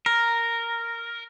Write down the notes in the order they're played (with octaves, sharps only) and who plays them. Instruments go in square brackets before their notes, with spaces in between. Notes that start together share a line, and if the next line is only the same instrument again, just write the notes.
[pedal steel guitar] A#4